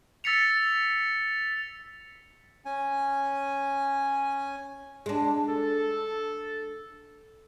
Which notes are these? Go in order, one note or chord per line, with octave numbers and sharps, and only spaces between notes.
E6 A6 B6 C#7 F7
C#4 G#5
G#3 D4
A4